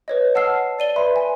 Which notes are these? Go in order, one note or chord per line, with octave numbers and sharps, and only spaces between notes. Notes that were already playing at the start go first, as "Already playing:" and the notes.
B4 C#5 D#5
F#5 A5 E6 F6 C7
D5 D#7 G7
B4 E5 B5 C6
G#5